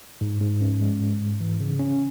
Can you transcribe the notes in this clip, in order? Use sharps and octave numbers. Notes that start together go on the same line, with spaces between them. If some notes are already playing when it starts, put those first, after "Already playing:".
G#2
G#2
C#4
G#3
G#2
G#2
E3
C#3
C#4